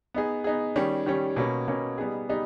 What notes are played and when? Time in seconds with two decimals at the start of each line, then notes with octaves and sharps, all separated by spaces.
0.14 B3 D#4 G#4
0.44 B3 D#4 G#4
0.76 D#3 G3 C#4
1.06 D#3 G3 C#4
1.36 B2 A#3 C#4
1.68 B2 A#3 C#4
1.98 G3 B3 D#4 G#4
2.29 G3 B3 D#4 G#4